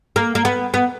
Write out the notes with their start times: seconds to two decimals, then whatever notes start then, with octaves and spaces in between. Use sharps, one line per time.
0.16 A#3
0.35 A#3
0.45 B3
0.74 B3